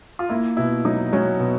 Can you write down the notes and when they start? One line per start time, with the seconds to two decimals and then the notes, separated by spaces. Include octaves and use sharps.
0.19 F4
0.29 A#3 E4
0.57 B2 E4
0.85 F#3 D#4
1.13 F#3 C#4
1.40 B2